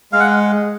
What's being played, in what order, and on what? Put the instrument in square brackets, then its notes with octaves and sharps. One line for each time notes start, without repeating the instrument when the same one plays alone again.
[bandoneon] G#3 [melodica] F5
[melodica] F#5